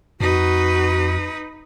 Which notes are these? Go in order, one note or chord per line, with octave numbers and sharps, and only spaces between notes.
F2 D#4 F#4 B4